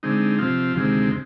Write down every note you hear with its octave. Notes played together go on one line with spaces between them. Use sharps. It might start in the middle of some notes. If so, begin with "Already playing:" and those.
D3 G#3 C4 D#4
C3 F3 C4 F4
D2 C3 D#3 G#3 C4